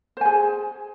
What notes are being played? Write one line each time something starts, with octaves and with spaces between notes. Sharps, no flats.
G#4 C5 G#5